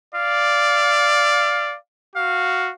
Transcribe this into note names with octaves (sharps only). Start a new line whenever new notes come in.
D5 F5
F#4 F5